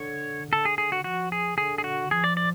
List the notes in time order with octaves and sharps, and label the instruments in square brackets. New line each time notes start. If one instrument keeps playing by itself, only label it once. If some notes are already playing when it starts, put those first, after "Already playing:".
Already playing: [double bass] D3 [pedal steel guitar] C#5
[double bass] D3 [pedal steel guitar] A4
[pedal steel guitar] G#4
G#4
F#4
[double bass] F3 [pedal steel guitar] F#4
[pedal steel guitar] G#4
[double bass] D3 [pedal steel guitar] G#4
[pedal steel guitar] G#4
F#4
[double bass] F3 [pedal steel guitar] G#4
[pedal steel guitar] D5
D5